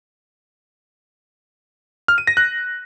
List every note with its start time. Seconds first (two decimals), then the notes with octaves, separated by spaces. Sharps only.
2.08 F6
2.18 D#7
2.27 A#6
2.37 F#6